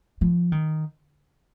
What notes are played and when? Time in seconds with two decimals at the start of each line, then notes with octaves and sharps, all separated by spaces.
0.21 F3
0.52 D#3